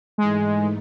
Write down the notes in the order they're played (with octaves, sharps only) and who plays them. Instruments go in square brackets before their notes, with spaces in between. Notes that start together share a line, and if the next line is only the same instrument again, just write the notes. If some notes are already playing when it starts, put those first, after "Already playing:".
[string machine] G#2 E3 A3 D#4 [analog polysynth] G#3